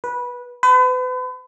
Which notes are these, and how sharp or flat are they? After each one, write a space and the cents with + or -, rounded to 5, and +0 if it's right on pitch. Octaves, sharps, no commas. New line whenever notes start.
B4 -15
B4 +40